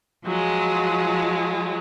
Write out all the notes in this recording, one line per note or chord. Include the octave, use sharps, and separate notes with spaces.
F3 F#3 G#3